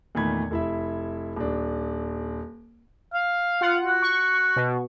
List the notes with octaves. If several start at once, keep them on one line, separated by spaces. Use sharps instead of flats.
E2 A#2 D#3 A3 B5 G#6
F1 E4 E5
D#1 D4
F5
F4 F#5
F#4
C#6
B2